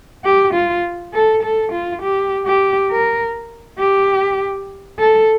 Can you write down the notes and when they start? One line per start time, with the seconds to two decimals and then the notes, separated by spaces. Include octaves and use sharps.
0.25 G4
0.54 F4
1.13 A4
1.43 A4
1.72 F4
2.02 G4
2.46 G4
2.91 A#4
3.79 G4
4.99 A4